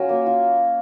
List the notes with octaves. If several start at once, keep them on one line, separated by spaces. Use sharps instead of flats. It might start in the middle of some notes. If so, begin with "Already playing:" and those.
Already playing: F#3 C#4 F4 A#4 G#5
A#3
F4